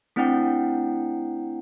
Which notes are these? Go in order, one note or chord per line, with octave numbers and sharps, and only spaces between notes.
A3 C4 D4 E4 F#5 G5